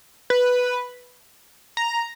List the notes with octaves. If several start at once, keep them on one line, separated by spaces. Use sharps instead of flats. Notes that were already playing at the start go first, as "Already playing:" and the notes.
B4
A#5